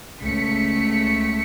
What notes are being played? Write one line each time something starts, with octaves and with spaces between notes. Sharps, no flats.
C#2 A3 B6 C#7